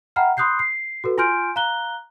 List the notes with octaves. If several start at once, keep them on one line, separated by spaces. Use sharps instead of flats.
E5 F#5 G5 A#5 B5 F6
B5 C6 D#6 F#6 G6 C7
C7
F#4 A4 B4
F4 G#5 C6 F6 G6 D7
F5 A#5 F#6 G7